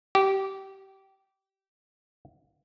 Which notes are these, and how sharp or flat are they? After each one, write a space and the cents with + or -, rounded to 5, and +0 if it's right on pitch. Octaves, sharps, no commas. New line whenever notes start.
G4 -20